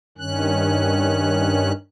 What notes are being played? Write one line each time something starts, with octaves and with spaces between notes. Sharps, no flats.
G2 D#3 C#4 F#6